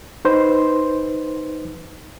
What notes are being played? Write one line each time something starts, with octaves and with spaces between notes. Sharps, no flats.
D#4 B4 C5 C6